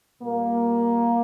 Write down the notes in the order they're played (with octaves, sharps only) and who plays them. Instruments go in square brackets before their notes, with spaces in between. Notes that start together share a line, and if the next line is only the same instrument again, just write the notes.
[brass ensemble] A#2 G3 A#3